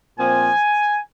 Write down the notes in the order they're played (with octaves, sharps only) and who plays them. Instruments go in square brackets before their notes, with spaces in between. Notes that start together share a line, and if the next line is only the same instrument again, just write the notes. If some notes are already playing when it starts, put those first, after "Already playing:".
[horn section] A#2 F3 C4 G#5